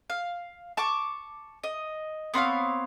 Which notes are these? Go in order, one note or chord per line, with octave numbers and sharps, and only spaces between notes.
F5
A5 C#6 D6
D#5
B3 C4 C#5 F5